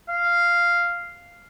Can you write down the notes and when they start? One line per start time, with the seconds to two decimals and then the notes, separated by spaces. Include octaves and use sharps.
0.09 F5